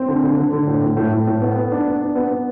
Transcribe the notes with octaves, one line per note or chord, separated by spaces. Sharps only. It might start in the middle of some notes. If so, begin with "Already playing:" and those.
Already playing: C4
D3
D3
D3
D3
A2
A2
A2
A2
A2
B3
B3
D4
B3
D4
B3
B3